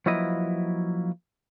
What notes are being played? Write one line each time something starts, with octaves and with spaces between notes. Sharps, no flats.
F3 F#3 A#3 E4 B4 D#5